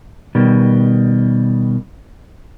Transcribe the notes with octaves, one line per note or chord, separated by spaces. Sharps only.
B2 D#3 G3